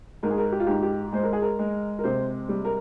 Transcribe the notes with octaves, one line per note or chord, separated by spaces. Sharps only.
G#2 A#4
G#4
A#4
G4
F4
G#2 G4
G4
G#3 C5
A#4
G#4
A#4
G#3
A#4
C3 C5
G3
A#4